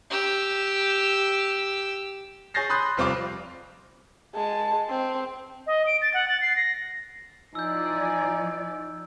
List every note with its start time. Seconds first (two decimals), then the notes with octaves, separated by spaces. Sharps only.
0.10 G4 E6
2.54 G#4 C#5 G6 A6 A#6 C7
2.69 B5 C6 D#6 F#6 G6
2.97 F1 G3 C4 F4 F5 D6
4.35 G#3 A5
4.89 C4
5.67 D#5
5.87 D7
6.02 A6
6.14 F#5
6.28 A6
6.42 C7
6.56 A#6
7.55 F3 D#4 E4 D5 G#5 E6 G6